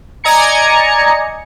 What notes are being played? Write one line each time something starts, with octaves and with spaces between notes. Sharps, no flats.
D5 D#5 G#5 A#5 G#6 C#7